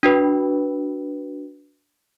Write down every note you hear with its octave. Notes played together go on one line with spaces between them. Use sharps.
D4 F#4 B4